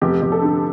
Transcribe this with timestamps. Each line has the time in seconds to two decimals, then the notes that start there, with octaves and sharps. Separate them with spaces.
0.02 F1 G4
0.22 F1
0.32 A4
0.42 D3